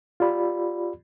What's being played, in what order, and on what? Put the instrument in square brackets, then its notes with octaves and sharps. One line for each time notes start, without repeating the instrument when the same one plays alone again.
[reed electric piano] F4 G4 D5 B5